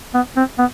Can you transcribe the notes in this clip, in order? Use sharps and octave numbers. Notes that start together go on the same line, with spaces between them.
B3
C4
B3